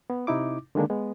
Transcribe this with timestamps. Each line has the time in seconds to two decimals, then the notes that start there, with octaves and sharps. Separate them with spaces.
0.10 B3
0.27 C3 D#4 E4 D6
0.75 D3 D#3 G#3 A#3 D4
0.90 G#3 B3